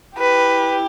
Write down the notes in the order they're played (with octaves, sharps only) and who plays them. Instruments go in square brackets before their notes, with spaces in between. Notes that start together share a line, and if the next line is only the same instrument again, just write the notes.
[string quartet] E4 G4 [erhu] B4